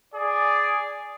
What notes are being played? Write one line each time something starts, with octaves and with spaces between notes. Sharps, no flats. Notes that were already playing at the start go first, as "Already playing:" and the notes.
G#4 D5